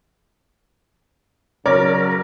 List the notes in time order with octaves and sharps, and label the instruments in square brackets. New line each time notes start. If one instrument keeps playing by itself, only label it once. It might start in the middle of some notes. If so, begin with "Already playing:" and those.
[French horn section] C#3 F#3 [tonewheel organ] A#4 [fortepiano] C#5 D5 D6